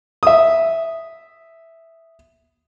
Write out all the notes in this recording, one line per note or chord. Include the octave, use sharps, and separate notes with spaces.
E5 D#6